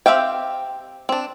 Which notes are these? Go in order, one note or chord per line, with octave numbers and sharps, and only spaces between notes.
C4 G4 E5 F5 G5
C4 D4